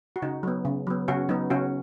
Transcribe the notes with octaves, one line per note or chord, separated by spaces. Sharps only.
F#4
C#3 D#4
F#3 B3
C#3
F#3 B3
C#3 C#4 F#4
F#3 B3 D#4
C#3 C#4 F#4